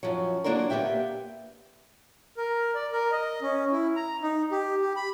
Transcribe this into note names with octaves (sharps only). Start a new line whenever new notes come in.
F#2 F3 F#3
D3 F#3 A#3 D4 F4 A#4
A#3 B3 G4 E5 G5
A#4
D5
A#4
D#5
C#4
E4
A#5
D#4
G4
G4
B5